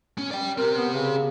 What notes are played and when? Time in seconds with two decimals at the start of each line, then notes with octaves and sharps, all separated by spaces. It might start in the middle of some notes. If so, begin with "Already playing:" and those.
0.18 C#4
0.31 D5 G5
0.57 C4 G4 A#4
0.76 B3
0.93 C#3